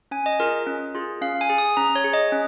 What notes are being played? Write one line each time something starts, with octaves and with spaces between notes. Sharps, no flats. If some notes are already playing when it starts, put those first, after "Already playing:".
C#4 G#5
D#5
F4 G#4 A#4
C#4
F4 G#4
C#4 F5
G#5
G#4
D#6
C#4 A#5
C#5
G#4
D#5
C#4